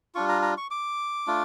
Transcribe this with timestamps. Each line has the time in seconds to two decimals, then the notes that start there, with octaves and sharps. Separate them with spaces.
0.15 G3 D4 F4 C#6
0.29 A#5
0.42 A#5
0.57 C#6
0.71 D6
1.27 A3 D4 F4